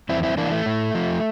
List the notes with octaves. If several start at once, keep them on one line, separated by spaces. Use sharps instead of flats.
E2 C4 E4
C4 E4
E3 A#3 D4
A3
A2
F3